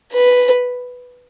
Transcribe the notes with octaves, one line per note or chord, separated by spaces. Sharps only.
B4